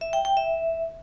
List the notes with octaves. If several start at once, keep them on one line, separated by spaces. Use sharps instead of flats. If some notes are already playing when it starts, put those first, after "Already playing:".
E5
G5
G5
E5